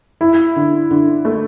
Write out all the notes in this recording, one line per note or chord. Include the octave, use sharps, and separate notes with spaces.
E4
D3
D3
A3